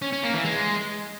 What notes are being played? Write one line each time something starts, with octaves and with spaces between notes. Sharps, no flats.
C#4
C#4
A#3
E3
G#3